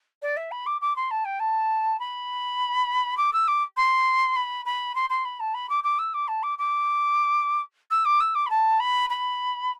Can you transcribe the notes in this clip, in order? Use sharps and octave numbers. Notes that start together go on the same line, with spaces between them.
D5
E5
B5
D6
D6
C6
A5
G5
A5
B5
D6
E6
D6
C6
B5
B5
C6
C6
B5
A5
B5
D6
D6
E6
D6
A5
D6
D6
E6
D6
E6
D6
B5
A5
B5
B5